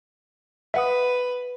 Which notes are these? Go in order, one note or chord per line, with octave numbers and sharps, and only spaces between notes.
B4 E5 F#5 D#6